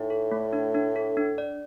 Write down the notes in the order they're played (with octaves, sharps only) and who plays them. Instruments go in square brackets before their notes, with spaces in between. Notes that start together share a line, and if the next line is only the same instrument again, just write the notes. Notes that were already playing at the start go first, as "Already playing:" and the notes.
Already playing: [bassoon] A2 [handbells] D#4
[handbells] A4
A3
D4
D4
A4
D4
D5